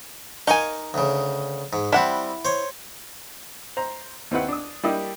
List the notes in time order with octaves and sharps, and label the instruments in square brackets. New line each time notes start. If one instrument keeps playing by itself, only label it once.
[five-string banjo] D#4 G#5 [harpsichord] A#4 F5 C#6
[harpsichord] D2 C#3
G#2
[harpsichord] G3 C4 [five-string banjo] E4 F#5
[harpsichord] C5 C#5
[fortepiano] C5 A#5
D#2 C4 E4 B4 F#5
D4 D#6
G3 A#3 D4 E4 G4 D#5